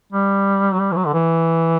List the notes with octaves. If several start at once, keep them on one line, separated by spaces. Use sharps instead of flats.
G3
F#3
G3
E3
F#3
D3
E3